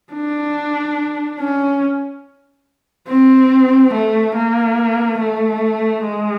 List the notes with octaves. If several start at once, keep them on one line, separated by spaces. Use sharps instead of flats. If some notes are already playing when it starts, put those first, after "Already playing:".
D4
C#4
C4
A3
A#3
A3
G#3